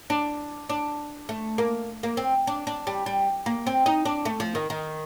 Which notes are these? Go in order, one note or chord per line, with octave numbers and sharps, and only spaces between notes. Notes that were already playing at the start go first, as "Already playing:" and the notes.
D4
D4
A3
A#3
A#3
C4
D4
D4
G3
G3
A#3
C4
D#4
D4
A3
F3
D#3
D#3